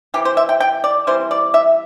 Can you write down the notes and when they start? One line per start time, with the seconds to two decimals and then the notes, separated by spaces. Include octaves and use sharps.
0.14 C3 E3 C4 G4
0.25 C5
0.37 E5
0.49 G5
0.60 G5
0.84 D5
1.07 E3 G3 C4 E4 C5
1.31 D5
1.54 E5